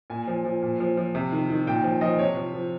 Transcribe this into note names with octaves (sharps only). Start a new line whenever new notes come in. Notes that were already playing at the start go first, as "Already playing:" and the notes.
A#2 G#5
F3
F3
A#2
F3
F3
C3
D#3
D#3
A#2 G5
F3
F3 D#5
C3 C#5
F3
F3